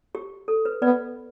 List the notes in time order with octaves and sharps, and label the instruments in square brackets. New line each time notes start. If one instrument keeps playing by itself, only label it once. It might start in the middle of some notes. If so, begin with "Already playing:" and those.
[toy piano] G4
A4
B4
[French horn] B3 [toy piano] B4 D5